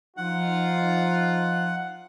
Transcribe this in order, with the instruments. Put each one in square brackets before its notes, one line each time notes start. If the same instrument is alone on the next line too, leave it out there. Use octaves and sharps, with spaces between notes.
[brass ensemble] F3 D#4 F4 [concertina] F#5